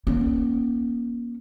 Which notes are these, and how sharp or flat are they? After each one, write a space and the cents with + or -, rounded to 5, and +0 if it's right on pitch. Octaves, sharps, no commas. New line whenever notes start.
A#3 +30 C#4 +0